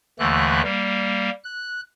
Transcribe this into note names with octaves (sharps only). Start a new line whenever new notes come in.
D#2 D3 E3 A3 F#6
G3 A#3
F#6